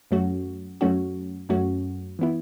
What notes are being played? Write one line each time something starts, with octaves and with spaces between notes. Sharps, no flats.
F#2 F#3 A3 C#4 F#4
F#2 F#3 A3 C#4 F#4
F#2 F#3 A3 C#4 F#4
E3 B3 E4